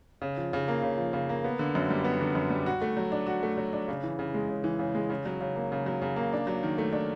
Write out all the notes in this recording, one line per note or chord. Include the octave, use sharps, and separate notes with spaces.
C#3
F3
C#3
A#3
C#3
F3
C#3
A#3
B3
D3
F#2
G3
B3
D3
F#2
G3
F#4
A3
F#3
D4
F#4
A3
F#3
D4
C#3
E3
C#3
G#3
C#3
E3
C#3
G#3
C#3
F#3
C#3
A#3
C#3
F#3
C#3
A#3
D4
F#3
D#3
A3
D4